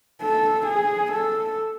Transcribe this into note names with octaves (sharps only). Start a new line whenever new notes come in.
A4
G#4
A4